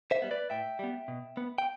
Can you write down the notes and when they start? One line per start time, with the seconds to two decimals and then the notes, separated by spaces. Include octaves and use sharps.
0.11 C5 E5
0.22 G3 B3
0.31 B4 D5
0.50 A2 E5 G5
0.79 G3 B3
1.08 B2
1.37 B3
1.58 G5